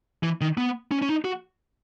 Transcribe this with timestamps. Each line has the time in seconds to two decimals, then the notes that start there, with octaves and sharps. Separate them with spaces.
0.23 E3
0.41 D#3
0.57 B3
0.91 C#4
1.02 C#4
1.09 D#4
1.25 F#4